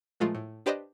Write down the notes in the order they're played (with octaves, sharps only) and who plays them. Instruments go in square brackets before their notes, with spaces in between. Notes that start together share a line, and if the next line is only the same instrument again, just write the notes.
[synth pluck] A#2 F3 G#3 A3 F4
A2
D4 G4 B4 C5 D5 D#5